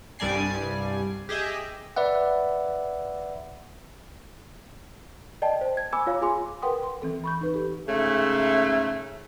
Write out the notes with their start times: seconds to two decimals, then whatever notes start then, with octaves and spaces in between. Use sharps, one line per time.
0.19 C2 G2 G3 D5 G#5 C7
1.29 G4 G#4 D#5 E5
1.96 B4 D5 E5 F#5
5.42 D5 D#5 G5 A5
5.61 C5
5.77 G#6
5.93 G#5 B5 D6 E6
6.07 F4 C#5 F5
6.22 F4 G#4 G#5 C6 D6
6.62 A#4 B4 F#5 G5 C6 D#6
6.83 C6
7.02 E3 C4 A4
7.24 B5 C#6 G6
7.41 D#4 B4
7.54 G4 A4
7.89 G#2 C#3 A3 E5